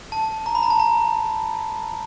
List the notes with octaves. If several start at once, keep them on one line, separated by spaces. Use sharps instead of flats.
A5
A#5
B5
A#5
A5
A#5